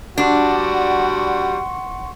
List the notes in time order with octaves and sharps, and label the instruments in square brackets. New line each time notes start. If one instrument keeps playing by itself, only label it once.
[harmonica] G3 F#4 [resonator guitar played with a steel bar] D4 [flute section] F#5 C6 C#6